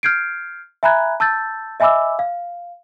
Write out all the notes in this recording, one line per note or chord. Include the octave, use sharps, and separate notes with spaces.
F6 G6 G#6 C7 D7
E5 G#5 A#5 B5 F#6 G#6
A5 E6 G6 A6
D#5 E5 G#5 B5 D6 E6
F5